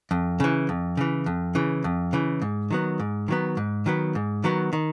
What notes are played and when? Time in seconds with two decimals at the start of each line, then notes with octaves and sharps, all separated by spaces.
0.11 F2
0.40 C#3 E3
0.69 F2
0.97 C#3 E3
1.26 F2
1.55 C#3 E3
1.84 F2
2.13 C#3 E3
2.42 G#2
2.71 D#3 F#3 B3
2.99 G#2
3.28 D#3 F#3 B3
3.57 G#2
3.86 D#3 F#3 B3
4.15 G#2
4.44 D#3 F#3 B3
4.73 D#3